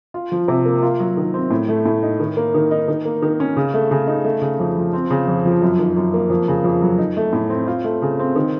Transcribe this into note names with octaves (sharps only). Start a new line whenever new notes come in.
F4
F3
C3
A#3
F4
F#3
D#3
C4
A2
A3
A2
D#4
D#3
A#3
D#3
D#4
D#3
A#3
D#3
C#4
C#3
A3
C#3
D#4
A3
C#3
F2
F3
C4
C#3
F2
F3
F#2
D#3
F#2
A#3
F2
C#3
F2
F#3
D#4
A3
A2
C4
F4
A3
C#3
C4
D#3